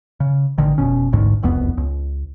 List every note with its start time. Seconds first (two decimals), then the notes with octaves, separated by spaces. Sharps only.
0.20 C#3
0.58 A1 D3 D#3
0.78 F1 B2 C#4
1.13 A1 D2 G#2
1.42 E1 C2 F2 B3
1.77 C#2